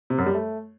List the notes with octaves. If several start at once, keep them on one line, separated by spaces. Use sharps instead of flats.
C3
F#2
G3
A3